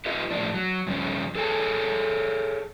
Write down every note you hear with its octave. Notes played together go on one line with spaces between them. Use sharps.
F4 G4 B4 D#5 E5
A2 C#3 F3 D4
F#3
G2 C#3 F3 C#4
G#4 A4 C#5 G#5 A5